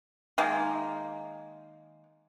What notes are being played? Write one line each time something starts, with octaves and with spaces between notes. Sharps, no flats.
D#3 G#3 A#3